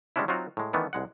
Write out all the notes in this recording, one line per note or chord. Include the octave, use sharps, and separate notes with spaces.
G3 G#3 B3 C#4 D4 E4
F#3 C4 D#4 F4 F#4
A2 G#3
D#3 E3 A3 B3 D4
C2 G#3 F#5